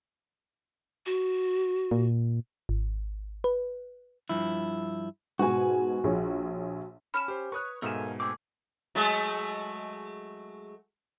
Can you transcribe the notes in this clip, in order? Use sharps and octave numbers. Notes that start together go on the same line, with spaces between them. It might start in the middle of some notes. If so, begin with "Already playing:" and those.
F#4
A#2
G#1
B4
G2 F3 E4
G#2 B2 F#4 G#5
A#1 G#4 C#5
C#4 B5 F6 E7
G4 C5
B4 C#5 C#6 D#6 F#6
G#2 B2 A3 A#4 F5 G#5 D#6 E7
A3 C4 G#4 D6
F#3 G#3 A3